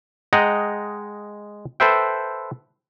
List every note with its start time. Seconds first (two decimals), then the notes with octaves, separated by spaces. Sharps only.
0.33 G#3 D#5 F#5 G5 A#5
1.80 A4 B4 C5 E5 G5